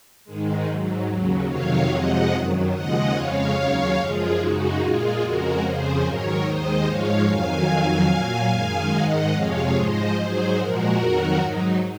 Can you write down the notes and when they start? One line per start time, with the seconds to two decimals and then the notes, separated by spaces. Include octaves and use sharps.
0.25 G#2 D#3 G#3
0.66 G#2 F#3
1.07 D#2 C#3 F#3
1.47 F2 C3 D#3 F#3 C#5 F5
1.89 F2 C3 F3 G#3 D#5 F#5
2.30 F#2 D#3 F#3
2.71 D#2 C#3 F3 G#3 D#5 F#5
3.13 F2 C#3 G#3 C#5 F5
3.54 D#2 C#3 F#3
3.95 F#2 F3 G#3 F4 G#4
4.37 F#2 C#3 G#3 D#4 F#4
4.78 A#2 G#3 F4 G#4
5.19 F2 C#3 G#3 F#4 A#4
5.60 F2 C#3 F3 G#4 C5
6.01 G#2 D#3 F#3 A#4 C#5
6.43 D#2 D#3 G#3 C5 D#5
6.84 G#2 F3 G#3 C#5 F5
7.25 F2 D#3 F#3 F5 G#5
7.66 F2 D#3 F#3
8.08 A#2 F#3
8.49 F#2 D#3 G#3
8.90 G#2 D#3 G#3 D#5 F#5
9.31 F2 C3 F3 G#3 C#5 F5
9.73 G#2 F3 G#3 C5 D#5
10.14 G#2 F#3 G#4 C5
10.55 A#2 F3 G#3 F#4 A#4
10.96 F2 D#3 F#3
11.37 G#2 F#3 D#4